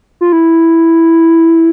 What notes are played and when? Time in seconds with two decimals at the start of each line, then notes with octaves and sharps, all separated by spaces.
0.21 F4
0.33 E4